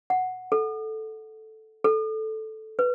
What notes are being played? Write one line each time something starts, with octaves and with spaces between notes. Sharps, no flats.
F#5
A4
A4
B4